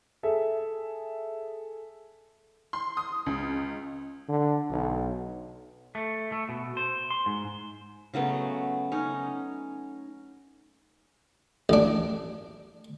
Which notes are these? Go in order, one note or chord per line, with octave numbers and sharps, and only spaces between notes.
G#4 A4 E5
C6
D#6
C#2
D3
B1
A3
A3
B2
C5
C6
G#2
C#3 F#3 A3 B3
C#4 D#4
A1 D4